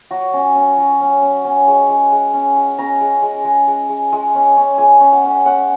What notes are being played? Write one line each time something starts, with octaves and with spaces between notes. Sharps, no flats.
F#3 F#4
C#4
C#4
F#3
C#4
C#4
C#4
G#3
G#3
G#3
C#4
G#3
C#4 A#5
G#3
G#3
G#3
G#3
G#3
G#3
C#4
C#4
G#3 G#5
C#4
F#5
C#4
C#4 F#5